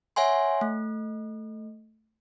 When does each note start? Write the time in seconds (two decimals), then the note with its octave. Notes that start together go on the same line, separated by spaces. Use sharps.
0.16 C#5 E5 F#5 G#5 C6
0.61 A3